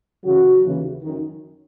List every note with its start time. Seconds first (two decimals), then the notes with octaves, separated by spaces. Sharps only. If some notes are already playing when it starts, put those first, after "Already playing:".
0.24 F#2 C#3 E3 F#3 F#4
0.64 D#2 C#3 E3
1.03 F#2 D#3